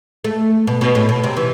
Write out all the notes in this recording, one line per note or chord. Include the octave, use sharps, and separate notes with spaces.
A3
B2
B2
A2
B2
C3
E3